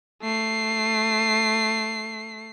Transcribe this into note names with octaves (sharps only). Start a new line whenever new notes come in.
A3 C7